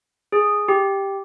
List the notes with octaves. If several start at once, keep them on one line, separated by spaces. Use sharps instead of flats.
G#4
G4